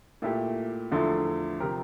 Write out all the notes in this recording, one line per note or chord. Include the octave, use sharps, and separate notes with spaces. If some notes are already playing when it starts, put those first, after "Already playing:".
A#2 A3 E4 G4
E2 D3 F3 A3 E4
C3 F3 C4 G4 A#4